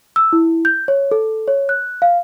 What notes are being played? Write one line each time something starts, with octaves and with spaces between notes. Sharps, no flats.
E6
E4
G6
C#5
A4
C#5
F#6
F5